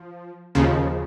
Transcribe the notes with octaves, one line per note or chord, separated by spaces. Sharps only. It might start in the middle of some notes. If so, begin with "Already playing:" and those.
Already playing: F3
D#2 C#3 F3